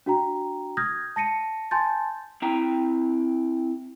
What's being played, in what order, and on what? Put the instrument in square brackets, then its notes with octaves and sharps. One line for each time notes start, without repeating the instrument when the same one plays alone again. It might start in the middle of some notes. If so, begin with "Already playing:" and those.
[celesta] D4 F#4 G5 A#5
D#6 F6 G6 G#6 A#6
A5 A#6 C#7 D#7
G#5 A5 C6 G6 A6
[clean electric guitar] C4 E4 G5 A#5